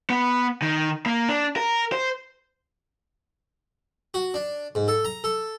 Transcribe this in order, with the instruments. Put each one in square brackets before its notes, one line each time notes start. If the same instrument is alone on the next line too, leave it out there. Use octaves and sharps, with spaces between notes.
[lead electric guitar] B3
D#3
A#3
D4
A#4
C5
[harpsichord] F#4
D4
G#2
A4
A#5
A4